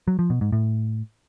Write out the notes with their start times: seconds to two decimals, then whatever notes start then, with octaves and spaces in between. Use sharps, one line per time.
0.08 F#3
0.19 F3
0.30 B2
0.41 G#2
0.52 A2